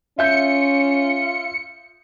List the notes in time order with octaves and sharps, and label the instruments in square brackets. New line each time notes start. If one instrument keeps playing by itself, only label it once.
[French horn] C#4 [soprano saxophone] F4 [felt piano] E5 G6 [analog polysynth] C#7